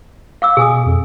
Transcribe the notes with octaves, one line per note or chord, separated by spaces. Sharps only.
F5 D6 E6
B2 G#4 G#5 D#6
F2